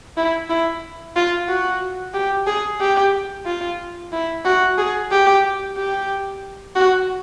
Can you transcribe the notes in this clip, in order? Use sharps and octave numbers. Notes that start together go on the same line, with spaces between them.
E4
E4
F4
F#4
G4
G#4
G4
F4
E4
F#4
G#4
G4
G4
F#4